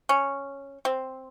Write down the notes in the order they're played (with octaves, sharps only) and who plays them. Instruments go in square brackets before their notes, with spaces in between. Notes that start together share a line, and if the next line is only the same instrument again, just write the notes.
[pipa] C#4
C4